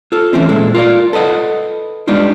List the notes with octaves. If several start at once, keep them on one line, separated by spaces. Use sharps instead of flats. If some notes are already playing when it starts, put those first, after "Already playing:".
F4 A4
E3 A3 C4 C#4
A#2 G#3 A4
F4 A#4 B4 D5 F5
A4 B4 D#5 F#5
G3 G#3 B3 D4 D#4 F4